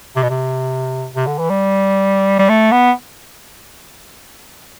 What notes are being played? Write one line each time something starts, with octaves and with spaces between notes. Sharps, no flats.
C3
B2
C3
C3
D3
E3
G3
G3
A3
B3